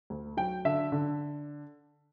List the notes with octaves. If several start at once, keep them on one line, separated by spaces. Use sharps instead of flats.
D2
F#3 G5
D3 E5
D3